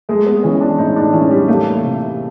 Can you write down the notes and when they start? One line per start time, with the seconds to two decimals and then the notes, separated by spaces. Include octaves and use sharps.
0.09 G#3 A3
0.27 B3
0.43 E3 C#4
0.61 D4
0.78 A2 D#4
0.96 D4
1.13 E3 C#4
1.31 G3
1.48 A3 A#3
1.83 C3